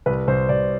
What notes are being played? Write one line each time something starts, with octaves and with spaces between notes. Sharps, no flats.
C2 B4
C2 C5
C2 D5